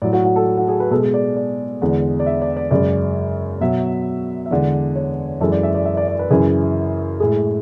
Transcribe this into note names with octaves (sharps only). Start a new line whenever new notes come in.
A2 F#3 D5
F#4
F#4
A4
F#4
G#4
B4
B2 G#3 A4
G#4
D5
D5
E2 D3 G#3
D5
E5
D5
D5
F#2 C#3 G#3 D5
B2 F#3 E5
E5
E2 D3 G#3 D5
C#5
F#2 E3 G#3 A4
D5
E5
D5
E5
D5
D5
B4
F#2 C#3 E3 G#4
A2 G#3 G#4